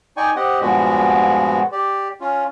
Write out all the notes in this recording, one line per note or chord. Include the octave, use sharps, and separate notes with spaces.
D#4 D5 G5 G#5 C#6
C4 G4 D#5 F#5
G2 A#2 F3 G#3 B3 F#4
G4 D5
C#4 F4